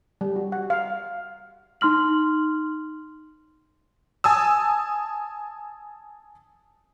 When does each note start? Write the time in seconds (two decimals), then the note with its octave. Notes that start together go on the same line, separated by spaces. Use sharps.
0.21 G3
0.36 F#4
0.52 F#5
0.70 F5
1.81 D#4 C6 F6 F#7
4.24 G#5 A5 D#6 E6